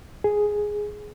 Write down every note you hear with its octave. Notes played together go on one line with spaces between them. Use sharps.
G#4